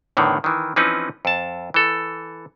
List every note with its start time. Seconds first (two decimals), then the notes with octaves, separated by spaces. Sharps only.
0.17 E2 A2 D3 D#3
0.44 D#3 E3
0.76 E3 F3 C4 C#4 D#4 B4
1.25 F2 A5
1.74 E3 A4